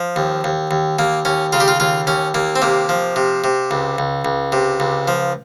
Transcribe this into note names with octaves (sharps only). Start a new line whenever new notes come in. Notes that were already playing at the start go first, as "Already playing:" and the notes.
Already playing: F3
D#2
D#2
D#2
D#2 A#3
D#2 C#4
C#3 F4
G4
F4
D#2 F4
D#2 C#4
D#2 A#3
C4
C3 A#3
F3
C3
C3
C#2
C#2
C#2
C3
C#2
F3